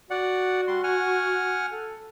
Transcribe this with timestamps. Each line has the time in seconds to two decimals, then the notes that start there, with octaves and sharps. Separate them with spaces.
0.10 F#4 D5 F#5
0.68 G3 C6
0.84 F#5 G#5 F6
1.72 A4